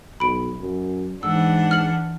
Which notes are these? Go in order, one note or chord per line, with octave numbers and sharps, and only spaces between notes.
B1 B5 D7
F#2
G#2 E3 D4 F#5 E6
F6 F#7